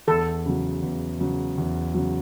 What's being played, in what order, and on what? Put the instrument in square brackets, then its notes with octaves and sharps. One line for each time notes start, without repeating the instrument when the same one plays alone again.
[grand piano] E2 [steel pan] A4
[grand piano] C#3 F#3
E2
C#3 F#3
E2
C#3 F#3